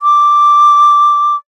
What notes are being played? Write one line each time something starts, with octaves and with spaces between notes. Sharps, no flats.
D6